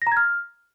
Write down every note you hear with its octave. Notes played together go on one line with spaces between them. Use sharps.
A#6
A#5
G#6
F6